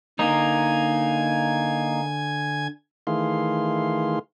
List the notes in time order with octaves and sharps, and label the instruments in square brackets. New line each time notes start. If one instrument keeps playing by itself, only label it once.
[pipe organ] D3 G#5 G#6 [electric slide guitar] A#3 D#4
[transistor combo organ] D#3 E3 A3 G#4 F5 C6